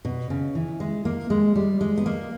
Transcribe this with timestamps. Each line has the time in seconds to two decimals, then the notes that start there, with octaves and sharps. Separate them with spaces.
0.05 B2
0.30 C#3
0.55 E3
0.80 G#3
1.05 A#3
1.30 G#3
1.56 G3
1.81 G#3
1.98 B3
2.06 A#3